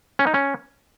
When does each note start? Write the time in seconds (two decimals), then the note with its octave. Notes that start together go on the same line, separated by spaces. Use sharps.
0.19 C#4
0.27 D#4
0.34 C#4